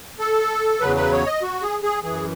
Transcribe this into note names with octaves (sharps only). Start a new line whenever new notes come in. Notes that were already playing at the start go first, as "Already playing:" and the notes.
A4
E2 C#3 F#3 B4
B4
C#5
D#5
F#4
G#4
G#4
F#2 E3 G#4